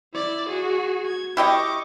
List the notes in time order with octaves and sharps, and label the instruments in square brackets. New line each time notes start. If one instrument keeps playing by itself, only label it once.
[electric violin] E4 D5
F#4 G#4
G#6
[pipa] E4 G4 D#5 [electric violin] C#6 D6